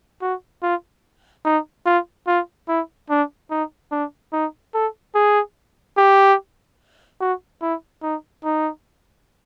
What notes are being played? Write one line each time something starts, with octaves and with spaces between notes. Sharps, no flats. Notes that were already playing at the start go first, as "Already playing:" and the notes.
F#4
F4
D#4
F4
F4
E4
D4
D#4
D4
D#4
A4
G#4
G4
F#4
E4
D#4
D#4